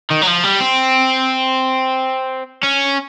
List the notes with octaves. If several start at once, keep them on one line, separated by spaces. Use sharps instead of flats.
D#3
F#3
F3
G3
C4
C#4